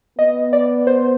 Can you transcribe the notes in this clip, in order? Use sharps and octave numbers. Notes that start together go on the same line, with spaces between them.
B3 D#5
D5
C5